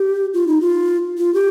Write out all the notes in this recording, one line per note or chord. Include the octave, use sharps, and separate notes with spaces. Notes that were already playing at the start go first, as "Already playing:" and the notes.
Already playing: G4
F4
D#4
F4
F4
G4